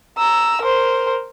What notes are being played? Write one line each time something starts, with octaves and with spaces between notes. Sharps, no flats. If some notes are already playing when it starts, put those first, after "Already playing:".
A#5 E6
A#4 C5